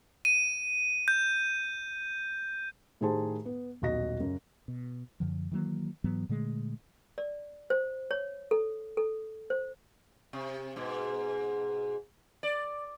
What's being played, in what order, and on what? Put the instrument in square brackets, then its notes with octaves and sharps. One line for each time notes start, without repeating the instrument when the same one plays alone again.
[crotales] D#7
G6
[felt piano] A2 D#3 G4 G#4 C5 A5
B3
D#1 B1 F#4 D#5 A#6
F#2 C#3
[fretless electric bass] B2
F#2 D3 F3
D#3 E3 F#3 A#3
G#2 E3 F#3 B3
A#2 D3 G#3 A3
[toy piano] D5
C5
C#5
A4
A4
C5
[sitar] C3
G#2 B2
D5